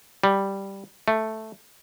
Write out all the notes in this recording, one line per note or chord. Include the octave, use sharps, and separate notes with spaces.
G3
A3